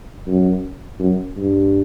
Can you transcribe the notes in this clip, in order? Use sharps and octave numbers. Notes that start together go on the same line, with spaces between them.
F#2
F#2
G2